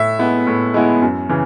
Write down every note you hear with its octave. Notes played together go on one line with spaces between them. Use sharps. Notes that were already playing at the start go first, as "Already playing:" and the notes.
Already playing: A2 E5
G#3 B3 E4
A2
G#3 B3 E4
F#2
C#3 E3